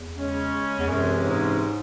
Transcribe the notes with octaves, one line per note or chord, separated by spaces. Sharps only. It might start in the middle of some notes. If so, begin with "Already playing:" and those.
Already playing: E2
C#3 G#3 C#4
E2
F#2 C3 E3 G#3 C#4
G#2